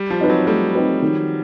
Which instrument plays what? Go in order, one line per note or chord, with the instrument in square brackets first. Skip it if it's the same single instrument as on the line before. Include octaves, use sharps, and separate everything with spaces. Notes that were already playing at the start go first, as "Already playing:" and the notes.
Already playing: [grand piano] G3
F3
[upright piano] C4 D#4 G4 B4
[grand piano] F#3
[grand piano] G3 [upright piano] A3
[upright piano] C4 D#4 G4 B4
D#3